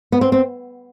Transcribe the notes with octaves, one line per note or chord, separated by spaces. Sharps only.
B3
C4
C4